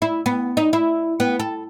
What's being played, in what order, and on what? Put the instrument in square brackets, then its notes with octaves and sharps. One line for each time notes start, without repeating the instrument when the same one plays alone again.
[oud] E4
B3
D#4
E4
B3
A4